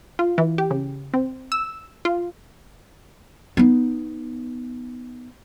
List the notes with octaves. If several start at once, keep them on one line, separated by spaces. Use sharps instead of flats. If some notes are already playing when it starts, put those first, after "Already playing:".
F4
E3
G4
C#3
C4
E6
F4
B3 D#4